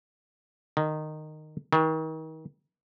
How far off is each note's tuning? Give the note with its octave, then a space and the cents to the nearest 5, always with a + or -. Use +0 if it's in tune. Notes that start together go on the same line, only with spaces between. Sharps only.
D#3 -15
D#3 +35